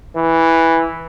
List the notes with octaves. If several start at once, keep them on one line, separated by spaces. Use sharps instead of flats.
E3